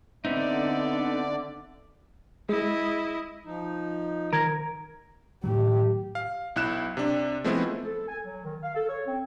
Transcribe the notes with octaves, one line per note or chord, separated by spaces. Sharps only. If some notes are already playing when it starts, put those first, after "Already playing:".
D3 B3 C4 D#4 D5 E5
G#3 E4 D#5
F3 D#4
D#3 A#4 G#6 A#6
A2 D#3 F#3 G4
F5
B1 E4 F#6 E7
C3 D4
F3 G#3 A3 B3 C4 E4
A4
G#5
F#3
D#3
F5
A4
C#5
C4